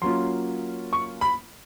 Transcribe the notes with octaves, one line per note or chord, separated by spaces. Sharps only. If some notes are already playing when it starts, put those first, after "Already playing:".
F#3 A#3 C#4 F4 C6
C#6
B5